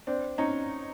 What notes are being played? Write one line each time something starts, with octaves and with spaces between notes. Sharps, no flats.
C4 D4
C#4 D#4